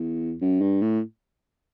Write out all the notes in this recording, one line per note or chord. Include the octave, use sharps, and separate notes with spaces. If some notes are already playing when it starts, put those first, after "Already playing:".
Already playing: E2
F#2
G2
A2